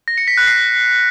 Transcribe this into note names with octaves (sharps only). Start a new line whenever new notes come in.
A#6
C#7
B6
F#6
C7